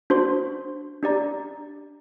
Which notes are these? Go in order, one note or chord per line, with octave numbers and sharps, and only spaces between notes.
D4 F#4 C5 C6
D4 G4 D5 A#5